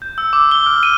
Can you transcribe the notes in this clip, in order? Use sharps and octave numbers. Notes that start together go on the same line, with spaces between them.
G6
E6
D6
G7
F6
D#7